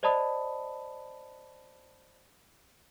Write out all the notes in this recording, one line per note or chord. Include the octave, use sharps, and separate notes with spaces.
C5 D5 D#5 A5 B5 D#6